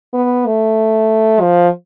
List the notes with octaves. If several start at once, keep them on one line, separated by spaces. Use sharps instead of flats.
B3
A3
F3